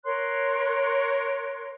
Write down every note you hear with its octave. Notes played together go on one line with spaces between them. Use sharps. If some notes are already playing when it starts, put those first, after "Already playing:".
A#4 C#5 C6 F#6